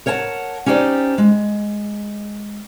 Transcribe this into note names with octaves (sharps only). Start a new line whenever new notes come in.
A#4 C#5 F#5 G5 A5
C#4 D#4 G4 C5 D5
G#3